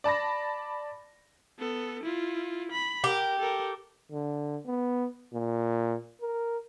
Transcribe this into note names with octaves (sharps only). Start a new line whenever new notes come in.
D5 A5 B5 A#6
B3 A4
E4 F4
B5
G4 A#4
A4 A#4
D3
B3
A#2
A#4